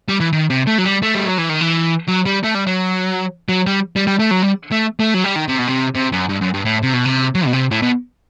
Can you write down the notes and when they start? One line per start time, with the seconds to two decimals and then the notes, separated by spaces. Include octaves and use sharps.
0.09 G3
0.20 E3
0.33 D#3
0.50 C3
0.67 A3
0.78 F#3
0.85 G3
1.02 A3
1.15 G3
1.26 F#3
1.38 E3
1.49 D#3
1.61 E3
2.08 F#3
2.26 G3
2.44 A3
2.55 G3
2.67 F#3
3.49 F#3
3.67 G3
3.96 G3
4.07 G3
4.19 A3
4.31 F#3
4.42 G3
4.72 A3
5.00 A3
5.14 F#3
5.24 G3
5.36 D#3
5.48 C3
5.58 B2
5.68 C3
5.95 C3
6.12 F#2
6.29 G2
6.41 F#2
6.54 G2
6.65 A2
6.83 C3
6.93 B2
7.05 C3
7.35 F#3
7.46 B2
7.53 C3
7.71 A2
7.82 B2